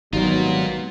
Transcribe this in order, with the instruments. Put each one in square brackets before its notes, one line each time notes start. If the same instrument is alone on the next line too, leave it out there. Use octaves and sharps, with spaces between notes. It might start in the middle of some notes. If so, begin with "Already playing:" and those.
[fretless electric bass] G#1 F#3 [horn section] B2 G3 B3 [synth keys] D#4 [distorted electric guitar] F4 A#4